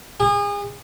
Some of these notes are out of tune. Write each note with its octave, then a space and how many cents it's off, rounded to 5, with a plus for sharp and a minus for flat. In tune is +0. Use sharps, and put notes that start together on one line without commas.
G#4 -35